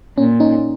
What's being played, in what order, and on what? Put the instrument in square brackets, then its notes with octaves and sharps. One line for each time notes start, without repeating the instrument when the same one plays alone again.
[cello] A#2 [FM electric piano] C#4
[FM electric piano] C#4 D#4